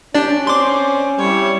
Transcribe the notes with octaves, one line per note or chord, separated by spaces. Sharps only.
C#4 D4 G4 D5
C4 D5 C6 D6
G3 E4 C#5